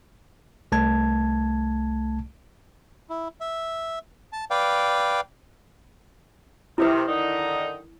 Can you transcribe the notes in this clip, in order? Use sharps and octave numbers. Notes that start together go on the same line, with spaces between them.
C2 A3 A5 G#6
E4
E5
A5
B4 D5 F5 G5
C3 D#3 E4 B4
D3 D#3 D#4